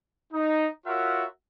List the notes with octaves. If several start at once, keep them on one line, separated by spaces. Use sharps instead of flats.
D#4
F4 F#4 A#4 C#5 E5 F#5